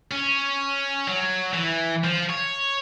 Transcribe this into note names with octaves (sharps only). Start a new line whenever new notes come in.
C#4
F#3
E3
F3
C#5